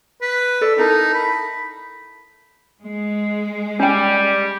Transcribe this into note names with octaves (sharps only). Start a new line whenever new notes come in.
B4
A4 D5
D#4 E4 A4 A#4
B5
G#3
G3 C#4 G5